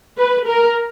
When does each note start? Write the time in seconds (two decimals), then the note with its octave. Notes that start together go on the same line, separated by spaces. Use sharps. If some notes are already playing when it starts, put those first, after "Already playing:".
0.19 B4
0.47 A#4